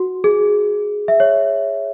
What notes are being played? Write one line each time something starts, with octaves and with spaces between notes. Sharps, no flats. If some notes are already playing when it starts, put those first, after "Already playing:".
Already playing: F#4
G#4
E5
C#5